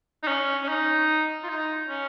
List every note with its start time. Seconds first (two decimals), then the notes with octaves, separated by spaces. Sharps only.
0.23 D#4
0.27 C#4
0.64 C#4
0.68 D#4
1.43 F4
1.49 D#4
1.88 C#4